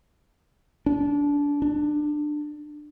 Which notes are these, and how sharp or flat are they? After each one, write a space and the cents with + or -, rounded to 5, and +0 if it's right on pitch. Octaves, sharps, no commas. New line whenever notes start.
D4 -25
D4 +20